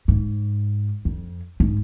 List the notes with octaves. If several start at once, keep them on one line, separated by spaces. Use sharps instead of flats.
G#2
F2
G#2